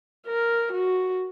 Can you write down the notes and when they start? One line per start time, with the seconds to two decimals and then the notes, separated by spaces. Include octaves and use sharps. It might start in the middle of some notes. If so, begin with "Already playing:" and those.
0.27 A#4
0.72 F#4